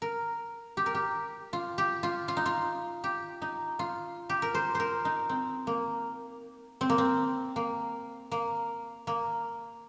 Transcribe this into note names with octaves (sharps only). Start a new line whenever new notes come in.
A#4
G4
A#4
G4
F4
G4
F4
F4
D#4
F4
G4
D#4
F4
G4
A#4
C5
A#4 C5
D#4
C4
A#3
C4
A#3
C4
A#3
A#3
A#3